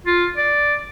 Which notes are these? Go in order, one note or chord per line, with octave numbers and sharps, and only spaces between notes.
F4
D5